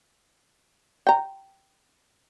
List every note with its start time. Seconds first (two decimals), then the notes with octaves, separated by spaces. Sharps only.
1.07 G5 A#5